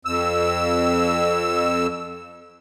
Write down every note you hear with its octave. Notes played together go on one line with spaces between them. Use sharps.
F2 E6